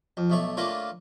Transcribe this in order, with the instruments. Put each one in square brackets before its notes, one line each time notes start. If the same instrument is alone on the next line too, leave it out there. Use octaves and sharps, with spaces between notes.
[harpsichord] F2
B1 A3 C#5
D3 A3 A#3 F4 A#4 C#5